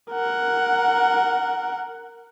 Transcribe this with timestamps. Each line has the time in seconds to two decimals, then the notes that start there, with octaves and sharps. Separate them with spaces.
0.12 A#4 F#5